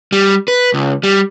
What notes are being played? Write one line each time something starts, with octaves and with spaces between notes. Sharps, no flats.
G3
B4
C#2
G3